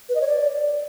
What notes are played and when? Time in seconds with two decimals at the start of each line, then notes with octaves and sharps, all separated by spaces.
0.09 B4
0.15 D#5
0.21 C#5
0.27 D5